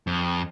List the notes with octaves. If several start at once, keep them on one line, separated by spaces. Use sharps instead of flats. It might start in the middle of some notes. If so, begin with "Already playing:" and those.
F2